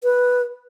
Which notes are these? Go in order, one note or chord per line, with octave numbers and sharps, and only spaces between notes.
B4